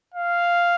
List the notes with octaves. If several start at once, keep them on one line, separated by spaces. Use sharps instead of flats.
F5